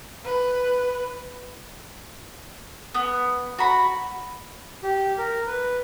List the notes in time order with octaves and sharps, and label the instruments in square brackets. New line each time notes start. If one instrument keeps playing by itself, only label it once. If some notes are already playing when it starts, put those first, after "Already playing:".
[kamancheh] B4
[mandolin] B3
F#4 B5
[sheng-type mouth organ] G4
A#4
B4